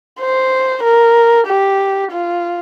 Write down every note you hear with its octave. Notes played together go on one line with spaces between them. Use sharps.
C5
A#4
G4
F4